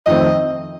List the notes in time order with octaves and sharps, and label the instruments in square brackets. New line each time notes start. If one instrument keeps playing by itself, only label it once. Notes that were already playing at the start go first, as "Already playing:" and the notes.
[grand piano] F2 D#3 A3 C4 [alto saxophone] D#5